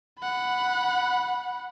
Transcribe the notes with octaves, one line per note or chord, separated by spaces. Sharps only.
F#5 B5